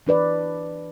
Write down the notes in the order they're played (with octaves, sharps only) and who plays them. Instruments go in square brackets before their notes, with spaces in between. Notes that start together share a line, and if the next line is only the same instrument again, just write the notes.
[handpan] E3 D4 B4 D5